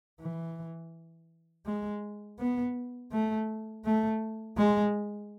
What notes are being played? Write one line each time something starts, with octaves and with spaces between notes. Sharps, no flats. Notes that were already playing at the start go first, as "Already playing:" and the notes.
E3
G#3
B3
A3
A3
G#3